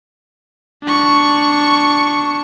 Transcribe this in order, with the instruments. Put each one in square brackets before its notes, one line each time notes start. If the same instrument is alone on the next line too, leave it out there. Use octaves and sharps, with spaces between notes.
[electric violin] D4 C#6